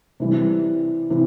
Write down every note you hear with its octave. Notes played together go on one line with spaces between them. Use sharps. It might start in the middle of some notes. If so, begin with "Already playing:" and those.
C3 E3 G3
C3 E3